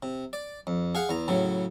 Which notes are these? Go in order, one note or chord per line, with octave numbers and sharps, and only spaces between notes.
C3
D5
F2
G#4 F5 F#5
E2 A#5
A2 C#3 F#3